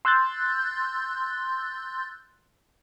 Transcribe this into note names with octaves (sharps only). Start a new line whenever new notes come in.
C6 E6 F#6 G6 A6